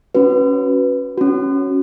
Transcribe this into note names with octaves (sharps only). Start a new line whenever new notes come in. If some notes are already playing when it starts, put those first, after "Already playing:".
C#4 F#4 B4
C#4 F#4